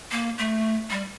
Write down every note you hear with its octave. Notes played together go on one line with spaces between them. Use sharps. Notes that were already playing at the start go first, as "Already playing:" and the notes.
A#3
A3
G3